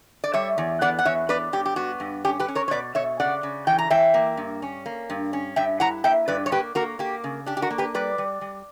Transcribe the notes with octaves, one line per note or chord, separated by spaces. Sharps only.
D5
G3 C#5 E5
E2
B3 D5 F#5
F#5
E2 C#5 E5
B3 B4 D5
G2 G4
G4
B3 F#4
G2
C#4 G4
G4 B4
C#4
A#4 C#5
C#5
B2 B4 D5
B2 C#5 E5
C#3 D5 F#5
C#3
E3 G5
A#5
E3 E5 G5
A#3
G2
C#4
A#3
G2
C#4
G2 E5 G5
E4 F#5 A#5
A#3 E5 G5
G2 B4 D5
C#5
A#3 G4 B4
A#3 F#4 A#4
A#3 G4
C#3
D4 G4
G4
F#4 A#4
A#3
G4 B4
G3 B4 D5
G3
G3